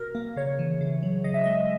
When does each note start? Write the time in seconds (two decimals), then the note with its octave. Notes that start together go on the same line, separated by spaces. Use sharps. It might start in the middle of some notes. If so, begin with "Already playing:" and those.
Already playing: B2 A#4
0.15 A#3
0.36 C#3 C#5
0.59 E3
0.81 C#3
1.03 F#3
1.24 C#3 D#5
1.34 E5
1.44 G#3 D#5